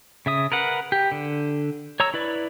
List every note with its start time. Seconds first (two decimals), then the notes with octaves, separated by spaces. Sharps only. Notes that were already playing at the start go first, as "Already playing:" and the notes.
0.26 C#3 E5 D#6
0.52 A#4 B4 F#5
0.92 G4
1.12 D3
2.00 C#5 A#5 E6
2.14 E4 B4 D5